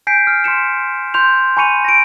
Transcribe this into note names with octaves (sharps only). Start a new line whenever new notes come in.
G#5 G6 B6 C7 D7
F6
C6 B6 C#7 E7
C6 G6 F7
G#5 B5 C#6 C#7 D#7 F7
A#6 D7